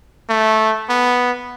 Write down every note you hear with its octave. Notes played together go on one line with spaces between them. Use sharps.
A3
B3